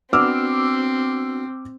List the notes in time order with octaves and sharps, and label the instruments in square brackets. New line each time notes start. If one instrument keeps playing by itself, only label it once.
[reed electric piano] B3 D4 F#4 [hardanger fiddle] C4 [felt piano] D6 E6 F6